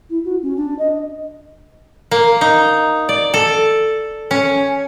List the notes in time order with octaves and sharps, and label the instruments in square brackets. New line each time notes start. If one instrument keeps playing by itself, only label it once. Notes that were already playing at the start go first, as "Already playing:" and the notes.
[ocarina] E4
F#4
C#4
D4
D#5
[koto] A#3
D#4
D5
A4
C#4